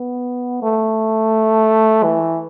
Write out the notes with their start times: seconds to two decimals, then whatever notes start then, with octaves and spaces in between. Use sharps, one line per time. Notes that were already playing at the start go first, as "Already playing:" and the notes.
Already playing: B3
0.62 A3
2.03 E3